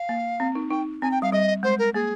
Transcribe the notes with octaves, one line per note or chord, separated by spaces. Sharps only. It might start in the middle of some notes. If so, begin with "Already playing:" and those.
Already playing: F5
A#3
C4
D#4
D#4 G5
C4 G#5
G5
G3 F5
G3 D#5
G#3 C5
A#4
A#3 G#4